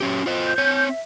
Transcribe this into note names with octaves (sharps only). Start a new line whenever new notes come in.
F#3 C#4 G4
F4 C5 D#5
G6
C4 C#5
E5